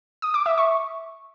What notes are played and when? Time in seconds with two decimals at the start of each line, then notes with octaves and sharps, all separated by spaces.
0.22 D#6
0.34 D6
0.46 E5
0.58 C#6